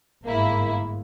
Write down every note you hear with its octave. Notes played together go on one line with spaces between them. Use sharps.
G1 G#2 A#3 E4